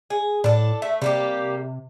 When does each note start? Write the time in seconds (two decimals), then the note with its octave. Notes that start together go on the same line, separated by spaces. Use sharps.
0.10 G#4
0.44 A2 D4 A4
0.82 A3 E5
1.02 C3 G3 A#3 G4